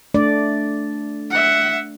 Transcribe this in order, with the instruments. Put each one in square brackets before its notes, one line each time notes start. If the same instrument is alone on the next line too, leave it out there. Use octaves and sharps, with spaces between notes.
[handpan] A3 D4 D5
[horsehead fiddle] E5 F#5